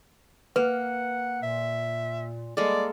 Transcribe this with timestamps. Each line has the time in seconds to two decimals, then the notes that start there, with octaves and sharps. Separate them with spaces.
0.56 A#3 B4 F#5
1.43 A#2 E5
2.57 G3 G#3 A#3 A4 D5